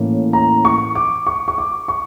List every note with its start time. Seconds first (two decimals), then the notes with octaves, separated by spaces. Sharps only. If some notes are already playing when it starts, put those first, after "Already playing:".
Already playing: A2 E3 A#3 C#4
0.33 A#5
0.65 C#6
0.95 D6
1.27 C#6
1.48 C#6
1.58 D6
1.88 C#6